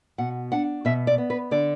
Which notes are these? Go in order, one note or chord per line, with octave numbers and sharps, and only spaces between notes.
B2 F#5
D4 F#5
B2 E5
D5
B3
B4
D3 D5